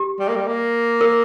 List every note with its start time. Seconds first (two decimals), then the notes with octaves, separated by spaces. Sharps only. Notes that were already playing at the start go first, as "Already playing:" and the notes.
Already playing: G4
0.20 G3
0.28 A#3
0.36 G3
0.47 A#3
1.01 A#4